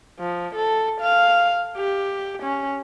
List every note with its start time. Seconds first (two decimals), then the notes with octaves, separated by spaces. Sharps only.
0.20 F3
0.55 A4
1.01 F5
1.77 G4
2.43 C#4